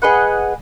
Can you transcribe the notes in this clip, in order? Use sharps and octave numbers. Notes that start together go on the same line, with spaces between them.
G#4 B4 D#5 F#5